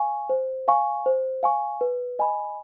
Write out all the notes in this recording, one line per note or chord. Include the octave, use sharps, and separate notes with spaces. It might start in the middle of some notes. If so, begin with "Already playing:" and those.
Already playing: F5 G#5 C#6
C5
F5 G#5 C#6
C5
F5 G#5 C#6
B4
D#5 G#5 B5